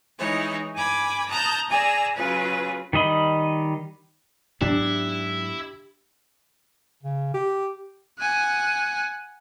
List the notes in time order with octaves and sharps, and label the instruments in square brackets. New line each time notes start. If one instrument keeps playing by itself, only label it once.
[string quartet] E3 G#3 D#4 E4 C#5
G2 G#5 B5 D6 G#6
A5 A#5 D#6 F#6 G6
G#4 D5 G#5 A#5 E6
C#3 F#3 F4 G#4 B4
[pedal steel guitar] D#3 G3 D#5 B5
[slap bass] G#2 F#3 B3 [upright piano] D4 [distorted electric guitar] E4 [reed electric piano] G4
[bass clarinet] C#3
G4
[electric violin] F#5 G#5